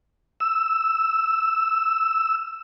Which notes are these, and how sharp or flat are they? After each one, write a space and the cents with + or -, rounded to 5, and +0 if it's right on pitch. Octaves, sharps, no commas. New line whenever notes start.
E6 +0